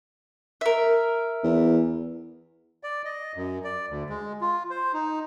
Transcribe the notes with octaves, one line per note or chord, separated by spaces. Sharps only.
A#4 E5
E2
D5
D#5
F#2
D5
D2
G#3
F4
C5
D#4